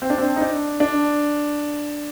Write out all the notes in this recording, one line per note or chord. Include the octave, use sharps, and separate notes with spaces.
C4
D4
C4
D#4
D4
D4